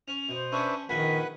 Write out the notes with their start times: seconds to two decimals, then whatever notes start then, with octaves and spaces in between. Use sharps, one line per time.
0.08 C#4 F7
0.29 B2 C5
0.52 C#4 D4 G#4 B4 E5 C#6
0.89 A#1 D#3 A#3 B4 F#5 G#5 B6